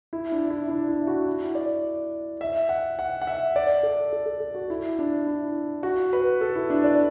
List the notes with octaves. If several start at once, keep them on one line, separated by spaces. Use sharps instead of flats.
E4
D4
E4
D4
E4
F#4
E4
D5
E5
F#5
F#5
F#5
E5
D5
A4
A4
A4
A4
F#4
E4
D4
E4
F#4
B4
A4
E4
D4
D5